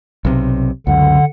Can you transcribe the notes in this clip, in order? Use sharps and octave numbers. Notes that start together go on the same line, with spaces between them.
B1 C3
C#2 F#2 D3 F#5